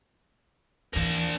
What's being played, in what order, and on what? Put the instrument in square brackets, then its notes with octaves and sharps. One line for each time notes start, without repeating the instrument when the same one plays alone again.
[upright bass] D#2 E3 [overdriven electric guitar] A#3 D4